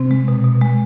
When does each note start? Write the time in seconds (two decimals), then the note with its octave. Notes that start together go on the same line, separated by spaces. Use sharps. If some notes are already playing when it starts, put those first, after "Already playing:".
Already playing: C3 C4
0.11 G#3
0.28 B2
0.45 B2
0.62 G#3